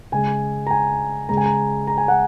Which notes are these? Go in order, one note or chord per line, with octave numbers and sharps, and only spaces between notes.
C#3 G#3 G#5
A#5
G#5
C#3 G#3 A#5
G#5
A#5
A#5
G#5
F#5